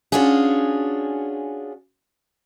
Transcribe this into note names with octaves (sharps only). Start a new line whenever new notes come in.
C#4 D4 F4 F#4 G#4